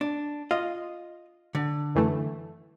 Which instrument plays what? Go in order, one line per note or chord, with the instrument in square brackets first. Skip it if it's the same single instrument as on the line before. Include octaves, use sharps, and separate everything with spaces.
[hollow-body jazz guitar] D4
[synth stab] F4 [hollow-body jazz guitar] D#5
[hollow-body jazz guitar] D3
[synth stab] F#2 E3 A3